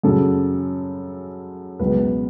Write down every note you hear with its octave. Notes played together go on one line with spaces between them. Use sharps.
F#2 C#3 F#3 A4
C#2 B2 F#3 B4